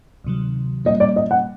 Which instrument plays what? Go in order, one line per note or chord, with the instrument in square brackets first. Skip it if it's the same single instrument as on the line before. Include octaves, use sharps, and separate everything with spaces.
[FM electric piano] D2 C3 D#3 F#3
[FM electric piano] A#2 G3 A#3 [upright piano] D#5
[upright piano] D5
D#5
F#5